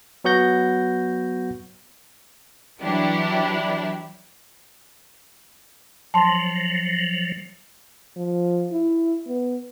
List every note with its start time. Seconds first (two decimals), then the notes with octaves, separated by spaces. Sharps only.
0.24 F#3 B3 F#4 F#5 G6 A#6
2.81 E3 F#3 D4 E4 G4
6.14 F3 F#3 A5 C6
8.16 F3
8.72 E4
9.27 B3